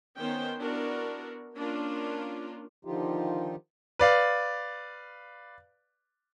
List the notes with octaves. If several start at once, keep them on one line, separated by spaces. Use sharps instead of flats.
D#3 B3 C#4 C5 G5
B3 D4 E4 F#4 A#4
A#3 C#4 D4 F4 A#4
D3 D#3 F3 D#4 F4 G4
B4 D5 F5